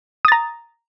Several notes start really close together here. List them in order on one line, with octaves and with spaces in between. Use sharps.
D#6 A6 A#5